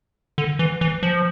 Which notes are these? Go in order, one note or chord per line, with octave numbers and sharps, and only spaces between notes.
D3
E3
E3
F3